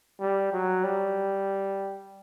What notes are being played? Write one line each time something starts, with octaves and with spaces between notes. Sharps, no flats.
G3
F#3
G3